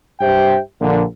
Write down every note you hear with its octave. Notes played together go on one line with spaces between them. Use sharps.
G2 G4 C5 E5 G5
A#1 A#2 D3